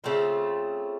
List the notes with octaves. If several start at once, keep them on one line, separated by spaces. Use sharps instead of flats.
C#3 A3 C4 F4